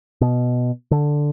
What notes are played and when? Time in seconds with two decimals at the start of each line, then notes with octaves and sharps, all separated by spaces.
0.21 B2
0.91 D3